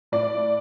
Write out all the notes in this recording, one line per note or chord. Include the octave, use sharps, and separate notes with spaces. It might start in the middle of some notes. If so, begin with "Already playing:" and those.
A2 D5